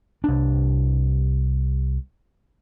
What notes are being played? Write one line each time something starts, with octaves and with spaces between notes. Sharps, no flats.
C2 D4